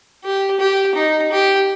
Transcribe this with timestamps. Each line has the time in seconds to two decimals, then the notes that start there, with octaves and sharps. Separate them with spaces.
0.24 G4
0.60 G4
0.95 D#4
1.32 G4